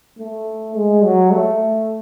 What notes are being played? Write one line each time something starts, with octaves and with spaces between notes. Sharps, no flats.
A3
G#3
F#3
A3